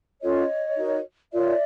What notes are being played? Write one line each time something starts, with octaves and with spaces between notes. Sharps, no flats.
C#4 F4 A4 C#5 D#5
D#4 F#4 A#4
F4 A#4 C#5 D5 E5